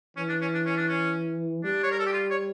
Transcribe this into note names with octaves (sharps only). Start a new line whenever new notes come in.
E3 C#4
D4
C#4
D4
C#4
D4
C#4
G3 D4
C#5
A#4
A4
G4
F4
C#5